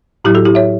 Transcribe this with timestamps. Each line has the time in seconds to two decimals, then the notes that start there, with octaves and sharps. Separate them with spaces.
0.24 A2 F#3 E4 G4
0.35 F#4 A4
0.45 E4 G4
0.55 C#5 E5